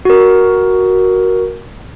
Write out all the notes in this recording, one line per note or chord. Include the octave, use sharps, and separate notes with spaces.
F#4 A#4